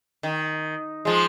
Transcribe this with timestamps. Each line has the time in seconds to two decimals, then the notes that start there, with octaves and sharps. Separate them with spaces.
0.23 D#3
1.05 F3 G#3